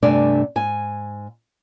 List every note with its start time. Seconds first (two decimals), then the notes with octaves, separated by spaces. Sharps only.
0.02 G2 C3 A3 D4 D5 G#5
0.56 G#2 G#5